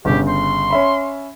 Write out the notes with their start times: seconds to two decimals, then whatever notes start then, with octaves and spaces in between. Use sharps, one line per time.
0.05 G1 C#3 G4
0.28 C6
0.70 C#4 E5 B5